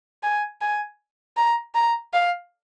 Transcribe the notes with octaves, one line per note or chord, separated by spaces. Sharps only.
G#5
G#5
A#5
A#5
F5